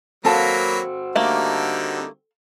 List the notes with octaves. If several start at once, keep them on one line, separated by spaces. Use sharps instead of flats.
F#3 A#3 C4 F#4 A4 F5 A5 B5
D3 G3 A3 A#3 D#4